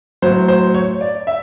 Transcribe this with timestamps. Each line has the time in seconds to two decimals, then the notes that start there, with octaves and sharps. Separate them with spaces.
0.22 F#3 C5
0.26 A2
0.48 C5
0.74 C#5
1.01 D5
1.27 E5